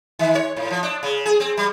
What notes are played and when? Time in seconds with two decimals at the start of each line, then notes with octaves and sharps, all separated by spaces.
0.19 D#3
0.35 C#5
0.57 A2
0.70 F3
0.83 D4
1.03 C#3
1.26 G#4
1.40 C4
1.57 G3